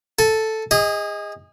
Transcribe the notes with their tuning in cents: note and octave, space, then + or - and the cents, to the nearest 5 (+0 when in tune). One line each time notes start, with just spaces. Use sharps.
A4 +0 G#5 +40
G#4 -30 D#5 +10